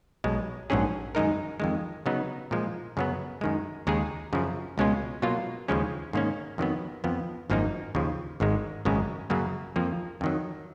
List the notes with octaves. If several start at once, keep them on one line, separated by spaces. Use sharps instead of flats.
B1 B2 G#3
A#1 G#2 F#3 C#4 G#4
F#2 D#3 G#3 D#4 A#4
F2 D#3 G#3
C#3 F#3 B3 D#4
A#2 F3 G#3
F#2 C#3 F#3 B3
F#2 D#3 G#3
D#2 C#3 G#3 D#4 G#4
F#2 C#3 F3
C#2 B2 G#3 C#4 F4
B2 F#3 A#3 F4
D#2 C#3 F3 G#3 C#4
G#2 D#3 A#3 C#4
F2 D#3 F#3 B3
F2 F3 B3
G#1 F#2 F3 A#3 D#4
D#2 C#3 F3
G#1 G#2 D#3 G#3
G#1 F#2 C#3 G#3
F#2 C#3 F#3 A#3
F2 F3 A#3
F2 D#3 F#3